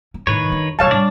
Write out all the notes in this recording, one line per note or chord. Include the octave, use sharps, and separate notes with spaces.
C#4
A2 D#3 B4 C#5
F#2 D4
D1 F#3 C#5 F5 A5
A2 G3 D4 D5